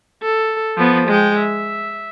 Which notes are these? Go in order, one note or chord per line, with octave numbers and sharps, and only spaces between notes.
A4
F3 B3
G#3 G5
E5